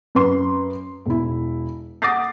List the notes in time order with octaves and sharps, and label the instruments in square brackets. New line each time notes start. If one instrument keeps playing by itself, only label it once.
[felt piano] F#2 B4 C6
E1 E4
F#5 D6 D#6 A6 A#6 C7